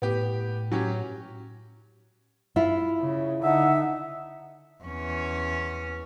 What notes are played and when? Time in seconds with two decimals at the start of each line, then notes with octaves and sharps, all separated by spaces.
0.02 A2 B3 G4
0.72 F#3 C#4 G4
2.56 E4 F4
3.01 C#3
3.43 D3 D#4 E5 F#5
4.84 E2 C#4